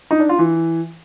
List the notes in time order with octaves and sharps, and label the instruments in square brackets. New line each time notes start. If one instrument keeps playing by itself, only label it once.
[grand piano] D#4
D4
F4
E3